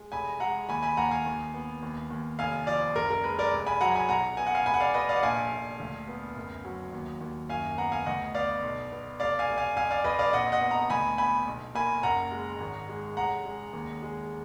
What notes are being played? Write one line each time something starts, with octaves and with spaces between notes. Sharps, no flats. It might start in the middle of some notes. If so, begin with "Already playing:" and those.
Already playing: G#3
F1 G#5 B5
G#3 F#5 A#5
D#2 G#5 B5
G#5 B5
D#2 F#5 A#5
F5 G#5
D#2
B3
D#2
D#2
F1 F5 G#5
F3 D5 F5
F#1 A#4
A#4
G#3 B4
A#4 D5
F1
G#5 B5
F#3 F#5 A#5
G#5 B5
B1 F#5 A#5
B3 G#5
F#5
F5 G#5
F1 G#5 B5
F#5
D5 F5
F1 B4 D#5
D5 F5
F#5
A#1 F5 G#5
A#1
D2
B3
F#1
F#3
D#2
D#2
F#2 F5 G#5
B3 F#5 A#5
F5 G#5
D2 D#5 F#5
B3 D5 F5
B1
B3
F1 D5 F5
F5 G#5
F1
F5 G#5
F2 F5 G#5
D5 F5
F2 B4 D#5
D5 F5
A#1 D#5 F#5
D#5 F#5
B3
F#5 A#5
D2 G#5 B5
B3 G#5 B5
B1
A#3 G#5 B5
F#1 F#5 A#5
G#3
G#1
G#3
F1 F#5 A#5
G#3
D#2
G#3